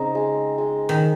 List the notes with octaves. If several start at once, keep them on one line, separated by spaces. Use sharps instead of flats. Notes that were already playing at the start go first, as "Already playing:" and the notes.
Already playing: C#3 C4 D#4
G#3
G#3
D#3